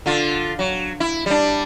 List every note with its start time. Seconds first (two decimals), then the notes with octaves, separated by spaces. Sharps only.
0.06 D3 F4
0.59 F#3
1.00 E4
1.26 G3 D4